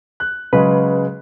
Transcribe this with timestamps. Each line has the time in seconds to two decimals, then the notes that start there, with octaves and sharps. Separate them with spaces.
0.20 F#6
0.53 C#3 F#3 G#3 B4